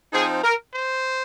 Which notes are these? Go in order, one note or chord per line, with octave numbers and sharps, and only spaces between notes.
F3 C4 D#4 G#4
A#4
C5